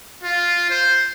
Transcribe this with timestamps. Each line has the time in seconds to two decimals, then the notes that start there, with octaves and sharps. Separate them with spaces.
0.23 F4
0.70 C5